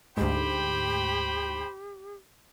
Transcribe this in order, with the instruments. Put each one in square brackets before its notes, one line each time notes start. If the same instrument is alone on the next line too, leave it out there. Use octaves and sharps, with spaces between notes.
[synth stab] D2 G#2 [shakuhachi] G4 [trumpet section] C5 G5 B5